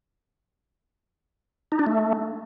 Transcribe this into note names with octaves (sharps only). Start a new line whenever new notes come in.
D#4
D4
A3